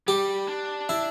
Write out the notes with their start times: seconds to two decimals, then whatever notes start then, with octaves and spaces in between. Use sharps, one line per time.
0.07 G3 G4
0.48 D4
0.89 E4